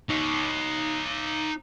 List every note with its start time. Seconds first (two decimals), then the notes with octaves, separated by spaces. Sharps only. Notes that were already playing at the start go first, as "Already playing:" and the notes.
0.09 D#4 C#5